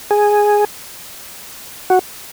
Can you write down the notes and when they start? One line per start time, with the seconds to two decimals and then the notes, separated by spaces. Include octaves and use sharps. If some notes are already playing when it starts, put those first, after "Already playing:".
0.11 G#4
1.90 F#4